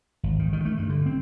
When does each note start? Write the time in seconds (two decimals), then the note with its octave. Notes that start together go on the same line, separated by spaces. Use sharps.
0.23 G#1
0.39 D#3
0.53 D#3
0.65 A3
0.77 G2
0.90 D3
1.06 C4